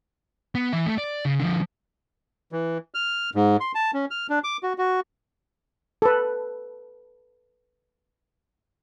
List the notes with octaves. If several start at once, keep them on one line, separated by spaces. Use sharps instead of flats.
B3
E3 E5
A3
D5
C#3
D3 F3
E3
F6
G#2
C6
A5
C#4
F6
D4
D6
F#4
F#4
A4 B4